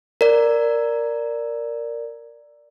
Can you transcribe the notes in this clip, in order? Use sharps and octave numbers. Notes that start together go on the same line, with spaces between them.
A#4 D5